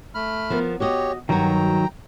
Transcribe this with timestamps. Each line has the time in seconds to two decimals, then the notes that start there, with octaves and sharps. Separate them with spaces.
0.15 A3 B5 F6
0.50 F3 B3 A#4
0.80 F#4 G4 C#5 D#5
1.29 G2 D#3 F#3 F#4 G5 A#5